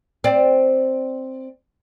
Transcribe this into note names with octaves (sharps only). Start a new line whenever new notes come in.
C4 D5